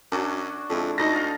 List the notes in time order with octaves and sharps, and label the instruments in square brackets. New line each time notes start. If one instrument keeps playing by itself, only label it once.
[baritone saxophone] F#2 [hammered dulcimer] D4 F#4 C#5
[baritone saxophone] F2 [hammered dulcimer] D3 G#3 E4
[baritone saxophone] D2 [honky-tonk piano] D#4 A#6
[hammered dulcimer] F5 A5